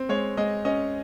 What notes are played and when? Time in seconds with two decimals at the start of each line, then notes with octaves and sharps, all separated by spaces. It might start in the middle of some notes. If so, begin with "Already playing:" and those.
Already playing: C4
0.09 G#3 C#5
0.37 G#3 D#5
0.65 C#4 D#5